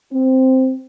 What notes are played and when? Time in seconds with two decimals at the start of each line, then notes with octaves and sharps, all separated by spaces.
0.13 C4